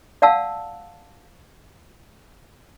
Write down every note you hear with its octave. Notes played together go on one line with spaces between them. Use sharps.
D5 F5 F#5 A5 E6